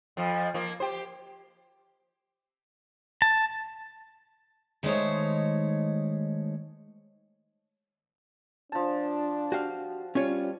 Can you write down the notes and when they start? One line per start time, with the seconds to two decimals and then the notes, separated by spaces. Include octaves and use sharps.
0.17 F2 F3
0.54 F3 A#3
0.80 G4 C5
3.22 A5
4.83 D#3 G#3 A3 D#4 C5 C#5
8.72 F3 D4 A5
9.52 F#4 G4 F5
10.15 G3 C#4 F4 C#5